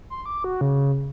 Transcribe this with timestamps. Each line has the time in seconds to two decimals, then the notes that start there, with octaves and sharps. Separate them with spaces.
0.10 C6
0.26 D6
0.44 F#4
0.61 C#3